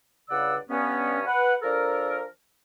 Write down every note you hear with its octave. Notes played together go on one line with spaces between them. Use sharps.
C#2 G2 C#3 D5 F#5 E6
G2 B3 C#4
B4 F#5
F3 D4 A4 A#4